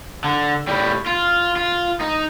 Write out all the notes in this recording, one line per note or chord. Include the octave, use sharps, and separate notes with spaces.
D3
A2 G3
F4
F4
D#4